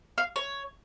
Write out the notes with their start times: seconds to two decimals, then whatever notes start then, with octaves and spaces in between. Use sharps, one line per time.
0.18 F5
0.36 C#5